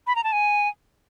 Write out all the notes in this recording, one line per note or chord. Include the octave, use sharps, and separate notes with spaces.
B5
A#5
A5
G#5